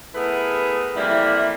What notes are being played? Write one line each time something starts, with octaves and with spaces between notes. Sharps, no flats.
A3 B3 E4 G#4 A#4 B4
F2 E3 G3 A3 A#3 E4